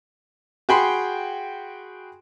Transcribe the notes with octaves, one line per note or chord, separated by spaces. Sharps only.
F#4 G#4 G5 B5 C6